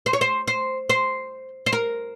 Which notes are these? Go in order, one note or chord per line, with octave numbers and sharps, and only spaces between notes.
C5
C#5
C5
C5
C5
C5
A#4